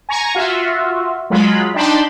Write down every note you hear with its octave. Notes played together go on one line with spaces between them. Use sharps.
G#5 A#5 C#6
F4 F#4 E5
F#3 G#3 F4 B5
D4 D#4 G5 A5 B5 C6